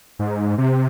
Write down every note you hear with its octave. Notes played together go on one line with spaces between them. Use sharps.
G#2
C3